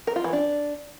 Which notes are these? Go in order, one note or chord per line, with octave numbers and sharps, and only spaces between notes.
A#4
F4
E3
D4